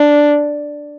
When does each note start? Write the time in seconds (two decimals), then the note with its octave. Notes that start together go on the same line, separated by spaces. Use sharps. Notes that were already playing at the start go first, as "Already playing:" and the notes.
Already playing: D4